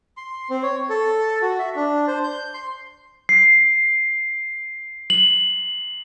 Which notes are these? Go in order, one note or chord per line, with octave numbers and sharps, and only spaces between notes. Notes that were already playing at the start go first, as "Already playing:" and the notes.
C6
C4
C#5
A4
F#4
E5
D4
C5
G6
C6
C7
F#7